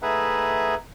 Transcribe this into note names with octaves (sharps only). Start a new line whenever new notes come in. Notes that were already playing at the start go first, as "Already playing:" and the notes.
A2 D#4 G#4 B4 E5 F#5